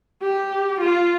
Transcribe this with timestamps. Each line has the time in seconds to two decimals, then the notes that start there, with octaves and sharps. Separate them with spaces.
0.22 G4
0.81 F4